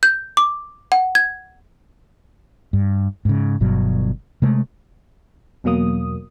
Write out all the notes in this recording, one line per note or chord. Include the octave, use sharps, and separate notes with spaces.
G6
D6
F#5
G#6
G2
G#2 C#3
G1 G2 B2 F#3
C3 G#3 A3
E2 B2 F#3 A#3 D#6